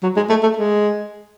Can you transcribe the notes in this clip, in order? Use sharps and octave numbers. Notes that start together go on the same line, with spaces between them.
F#3
G#3
A3
A3
G#3